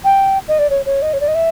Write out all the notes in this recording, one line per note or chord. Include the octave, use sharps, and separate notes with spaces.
G5
D#5
D5
C#5
C#5
D#5
C#5
D5
D#5
E5